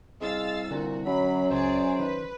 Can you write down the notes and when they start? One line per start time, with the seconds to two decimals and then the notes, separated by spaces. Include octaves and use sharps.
0.21 C2 G#3 F5 E6 A6
0.71 C2 A#2 D3 F#4
1.06 F#2 F#3 B5
1.51 C#2 G#4 C5 D5
1.99 D#3 B4